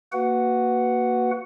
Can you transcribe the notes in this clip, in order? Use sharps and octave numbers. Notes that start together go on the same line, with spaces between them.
A#3 F#4 B4 F#5